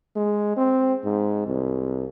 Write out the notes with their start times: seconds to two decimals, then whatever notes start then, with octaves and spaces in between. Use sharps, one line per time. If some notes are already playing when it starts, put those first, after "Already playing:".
0.16 G#3
0.57 C4
1.05 G#2
1.47 C2